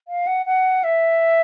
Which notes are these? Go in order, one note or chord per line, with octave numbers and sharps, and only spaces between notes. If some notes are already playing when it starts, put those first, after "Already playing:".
F5
F#5
F#5
E5